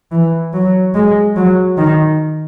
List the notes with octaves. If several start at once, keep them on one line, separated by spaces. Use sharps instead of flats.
E3
F#3
G#3
F#3
D#3